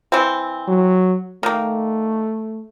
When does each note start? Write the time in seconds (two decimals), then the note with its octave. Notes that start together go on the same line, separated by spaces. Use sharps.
0.12 E3 C4
0.68 F#3
1.43 D#3 A3 A#3